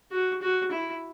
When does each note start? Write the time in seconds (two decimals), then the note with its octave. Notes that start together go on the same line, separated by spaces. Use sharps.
0.12 F#4
0.42 F#4
0.71 E4